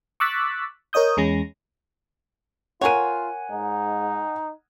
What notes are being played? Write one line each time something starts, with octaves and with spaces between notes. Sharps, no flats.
C#6 D6 E6 F#6 A6 B6
A#4 C#5 D#5 D#6 G6
E2 G#3 C#4 A#6
F4 A#4 C#5 F#5 G#5 D#7
G#2 D#4